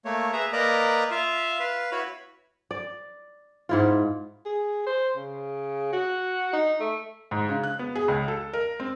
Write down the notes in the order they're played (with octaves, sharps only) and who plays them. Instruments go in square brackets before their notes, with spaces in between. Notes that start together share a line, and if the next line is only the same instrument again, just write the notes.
[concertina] A3 A#3 C#5
G#4 B4 E5 A#5
A#3 A#4 B4 D5 D#5 A#5
F4 E5 F5
B4 F5
E4 F#4 B4 C#5 B5
[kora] D5
G#2 E4 F4
[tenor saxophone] G#4
C5
C#3
F#4
D#4
A3
[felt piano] G#2
C#3
F#6
B3
G#4
C#2
A4
A#4
C4